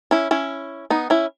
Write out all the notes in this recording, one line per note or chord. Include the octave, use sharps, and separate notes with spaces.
C#4 E4
C#4 E4
B3 D#4
C#4 E4